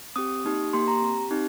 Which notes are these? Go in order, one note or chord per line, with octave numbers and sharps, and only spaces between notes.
C4 G4 D#6
A#3 D#4 G4
A#3 G4 C6
A#5
C4 G4
C4 D#4 G4